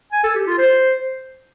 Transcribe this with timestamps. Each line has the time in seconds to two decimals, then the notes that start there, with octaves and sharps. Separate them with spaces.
0.13 G#5
0.24 A4
0.35 G4
0.47 F4
0.58 C5